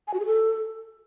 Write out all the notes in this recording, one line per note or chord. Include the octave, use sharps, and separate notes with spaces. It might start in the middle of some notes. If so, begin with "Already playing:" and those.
G#5
F#4
G#4
A4